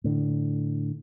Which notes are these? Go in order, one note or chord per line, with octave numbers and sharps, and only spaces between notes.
A2 D3